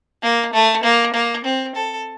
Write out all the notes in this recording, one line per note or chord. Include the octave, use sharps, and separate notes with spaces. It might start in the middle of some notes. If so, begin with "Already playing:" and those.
A#3
A3
A#3
A#3
C4
A4